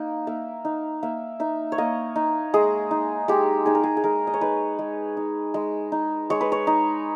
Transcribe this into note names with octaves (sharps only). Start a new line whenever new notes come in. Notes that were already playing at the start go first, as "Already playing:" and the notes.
Already playing: A#3 D#4
A#3 E5
D#4
A#3 E5
D#4 E5
C#5
A#3 D#5
D#4
G#3 G#4
D#4
G#3 G4
D#4 G#4
A#4
G#4
G#4
G#3 A#4
D#5
C#5
D#4 B4
G#3
D#4
G#3
D#4
G#3 C#5
B4
C#5
D#4